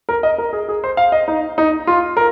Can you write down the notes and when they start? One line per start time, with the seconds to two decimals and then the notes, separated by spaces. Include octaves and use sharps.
0.09 A#4
0.23 D#5
0.38 A#4
0.53 G#4
0.69 G#4
0.84 C5
0.97 F5
1.12 D#5
1.28 D#4
1.58 D#4
1.87 F4
2.17 A#4